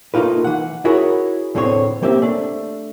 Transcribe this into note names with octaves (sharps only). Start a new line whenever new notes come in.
A3 A#3 D#4 F4 B4
E3 F#5
E4 F#4 G#4 A#4 C#5
E2 A2 D3 C4 C#5
A#3 C4 G4 E5
A3 D4